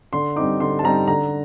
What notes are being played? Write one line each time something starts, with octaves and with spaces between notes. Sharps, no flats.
D3 C6
G3 C4 D#4 D6
D3 C6
A5
G3 C4 D#4 A#5
D3 A#5